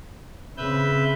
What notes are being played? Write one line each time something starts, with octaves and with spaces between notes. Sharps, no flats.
C#3 C4 B4 E5 G6